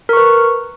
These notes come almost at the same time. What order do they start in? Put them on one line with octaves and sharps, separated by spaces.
A#4 C#6 B4